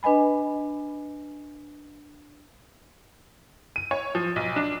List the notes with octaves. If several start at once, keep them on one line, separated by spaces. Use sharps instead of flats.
D4 B4 D#5 G#5 B5
D#7
C#5
F3
B1
D4